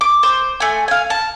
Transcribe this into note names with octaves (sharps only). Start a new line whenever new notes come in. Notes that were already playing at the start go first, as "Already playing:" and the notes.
D6
C5
A3 G#5
F5 G#5
A5